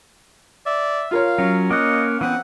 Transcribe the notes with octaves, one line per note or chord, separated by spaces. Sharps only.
D5 E5
F4 A#4 C#5 F5
F#3 C#4
A#3 D#5 F#5
E3 B3 C4 F#5